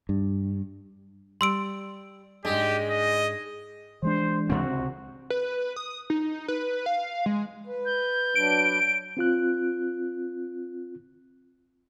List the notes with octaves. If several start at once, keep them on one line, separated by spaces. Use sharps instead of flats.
G2
G3 C6 E6 D7
G#2 G#3 D4 G4
D#5
E3 G#3 D4 C5
C#2 C3 C4 F#4
B4
D#6
D#4
B4
F5
G#3
B4
G6
F#3 D4 B4 D7
C4 F4 F#6